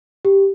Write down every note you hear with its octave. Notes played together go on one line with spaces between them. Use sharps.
G4